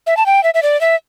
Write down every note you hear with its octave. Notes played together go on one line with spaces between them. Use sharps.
E5
A5
G5
E5
E5
D5
E5